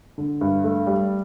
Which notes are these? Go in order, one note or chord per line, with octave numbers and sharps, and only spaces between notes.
D3
G2
A3
G3